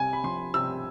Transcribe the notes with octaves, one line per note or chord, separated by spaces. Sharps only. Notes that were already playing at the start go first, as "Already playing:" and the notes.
Already playing: C2 C3 G#5
B5
F3 C6
C3 E6